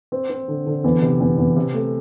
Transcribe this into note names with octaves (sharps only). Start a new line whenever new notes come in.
C4
C4
D3
D3
E2
C3
E2
E2
C3
A3